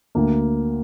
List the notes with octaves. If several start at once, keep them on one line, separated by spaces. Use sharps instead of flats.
D2 A#3